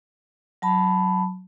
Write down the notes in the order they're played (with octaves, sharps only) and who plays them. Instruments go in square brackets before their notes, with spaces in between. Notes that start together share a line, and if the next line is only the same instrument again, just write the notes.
[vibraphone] F#3 A5 B5